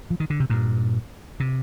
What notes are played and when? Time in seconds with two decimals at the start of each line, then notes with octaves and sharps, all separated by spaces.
0.10 F3
0.20 D#3
0.30 D3
0.40 C3
0.50 G2 A#2
1.40 C3